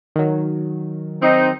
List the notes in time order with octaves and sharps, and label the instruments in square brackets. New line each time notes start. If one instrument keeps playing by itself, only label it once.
[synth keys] D#3 F#3
[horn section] C4 D#4